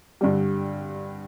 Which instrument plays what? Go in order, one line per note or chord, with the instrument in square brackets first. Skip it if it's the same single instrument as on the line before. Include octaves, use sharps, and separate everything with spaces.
[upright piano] G2 D3 G3